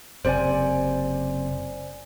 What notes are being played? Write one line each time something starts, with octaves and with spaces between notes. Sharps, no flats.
F#1 C3 C5 D5 G#5